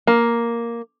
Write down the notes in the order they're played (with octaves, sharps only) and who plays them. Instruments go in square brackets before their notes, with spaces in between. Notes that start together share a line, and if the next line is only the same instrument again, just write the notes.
[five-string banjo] A#3